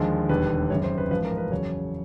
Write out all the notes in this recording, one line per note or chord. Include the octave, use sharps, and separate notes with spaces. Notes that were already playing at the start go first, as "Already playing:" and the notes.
Already playing: D#2 D3 F3 G#3
E1 D#2 D3 G3 B4
G#1 F#2 C#3 C#5
C5
B4
A1 G#2 F3 B4
A#4
B4
E2 C#3 F#3 C#5